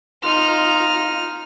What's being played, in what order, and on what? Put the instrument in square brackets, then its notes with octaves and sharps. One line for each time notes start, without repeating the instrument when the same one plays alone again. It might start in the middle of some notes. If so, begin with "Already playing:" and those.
[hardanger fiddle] D#4 [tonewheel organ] F4 [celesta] C6 [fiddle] F6